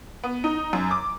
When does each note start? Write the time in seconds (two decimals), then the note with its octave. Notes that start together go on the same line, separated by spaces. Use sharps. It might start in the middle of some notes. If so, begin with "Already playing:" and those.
0.24 B3
0.44 D#4
0.73 F#2
0.91 D6